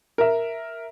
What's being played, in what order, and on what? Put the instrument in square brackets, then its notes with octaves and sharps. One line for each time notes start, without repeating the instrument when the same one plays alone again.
[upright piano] A#4 E5